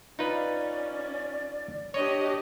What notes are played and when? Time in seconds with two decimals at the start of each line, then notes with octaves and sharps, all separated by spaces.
0.19 C#4 D#4 F4 B4 D5
1.94 D4 G4 C#5 D#5